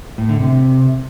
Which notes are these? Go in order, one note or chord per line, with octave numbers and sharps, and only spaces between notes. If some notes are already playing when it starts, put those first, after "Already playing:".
A2
D3
C3